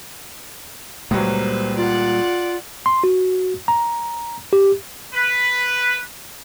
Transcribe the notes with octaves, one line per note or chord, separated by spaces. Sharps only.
C#2 A#2 F#3 G3 B4 C5
F4 D5 F#5
C6
F#4
A#5
G4
B4